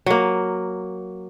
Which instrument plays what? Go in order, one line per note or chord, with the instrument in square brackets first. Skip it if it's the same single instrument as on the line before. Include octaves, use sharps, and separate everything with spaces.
[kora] F#3 A#3